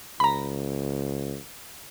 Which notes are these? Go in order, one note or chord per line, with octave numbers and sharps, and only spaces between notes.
C#2 A#5 B5